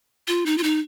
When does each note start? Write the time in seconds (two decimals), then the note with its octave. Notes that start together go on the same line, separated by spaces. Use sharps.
0.28 F4
0.46 D#4
0.58 F4
0.63 D#4